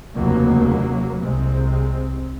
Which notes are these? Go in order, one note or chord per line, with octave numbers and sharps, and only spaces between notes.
F1 D#2 C#3 F#3 A#3
C2 C3 G#3 C4